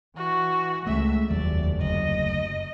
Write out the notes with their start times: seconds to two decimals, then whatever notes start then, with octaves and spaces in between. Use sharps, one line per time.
0.17 E3 F#4
0.87 C#2 A3 E5
1.30 F1 D#2 F#3 D5
1.81 F#1 D2 D#5